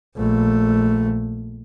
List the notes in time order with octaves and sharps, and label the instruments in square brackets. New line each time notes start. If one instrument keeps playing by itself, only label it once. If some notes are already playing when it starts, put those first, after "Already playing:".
[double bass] A#1 A3